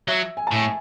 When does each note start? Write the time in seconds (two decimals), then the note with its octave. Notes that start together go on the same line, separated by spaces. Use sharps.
0.08 F#3 E5
0.37 G#5
0.47 A5
0.52 A2 G#5